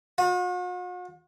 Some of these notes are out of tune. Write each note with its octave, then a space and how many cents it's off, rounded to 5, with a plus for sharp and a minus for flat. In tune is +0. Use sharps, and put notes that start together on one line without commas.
F#4 -45